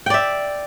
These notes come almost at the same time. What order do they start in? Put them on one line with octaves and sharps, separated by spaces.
G5 D5 E5